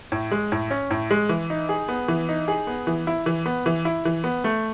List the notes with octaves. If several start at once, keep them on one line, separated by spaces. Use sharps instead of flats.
A2
G#3
A2
C#4
A2
G#3
E3
D#4
G#4
B3
E3
D#4
G#4
B3
E3
E4
E3
B3
E3
E4
E3
B3
A3